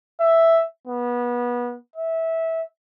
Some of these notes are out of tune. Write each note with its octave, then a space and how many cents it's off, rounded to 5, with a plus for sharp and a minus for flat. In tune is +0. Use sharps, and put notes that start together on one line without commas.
E5 +0
B3 -25
E5 -15